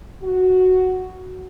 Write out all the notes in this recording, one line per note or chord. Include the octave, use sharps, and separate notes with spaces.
F#4